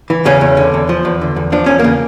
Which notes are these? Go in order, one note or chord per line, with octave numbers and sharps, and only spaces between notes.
E3
E2 C#3 C#4
E2
D3
E2
F3
E2
D3
E2
F3 D4
E2 C#4
C#3 A#3